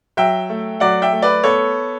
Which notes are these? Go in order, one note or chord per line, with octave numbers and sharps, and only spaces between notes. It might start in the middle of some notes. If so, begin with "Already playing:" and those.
F#3 E5 G5
A3
F#3 D5 F#5
E5 G5
A3
B4 D5
B3 A4 C#5